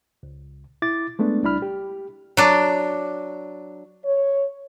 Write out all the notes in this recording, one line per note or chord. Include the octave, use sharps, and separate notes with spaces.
C#2
E4 D6 A6
G#3 A3 B3 D4
C#2 G3 D4 E4 B5 F6
G4
F#3 D4
C#5